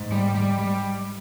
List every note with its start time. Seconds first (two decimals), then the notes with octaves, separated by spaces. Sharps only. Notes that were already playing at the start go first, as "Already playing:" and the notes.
Already playing: G#2
0.12 G3
0.35 G3
0.59 G3